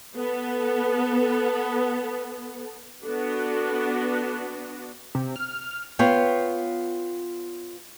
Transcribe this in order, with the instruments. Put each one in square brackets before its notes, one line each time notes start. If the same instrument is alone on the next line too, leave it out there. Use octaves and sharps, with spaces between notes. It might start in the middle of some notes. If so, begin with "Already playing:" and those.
[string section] B3 A4
[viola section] B3 D4 F#4 [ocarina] A4
[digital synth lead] C3
F6
[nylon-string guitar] B3 F4 C#5 G5